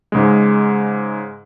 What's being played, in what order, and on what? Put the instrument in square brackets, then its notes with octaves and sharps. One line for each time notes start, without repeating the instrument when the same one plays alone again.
[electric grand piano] G#2 C#3 G#3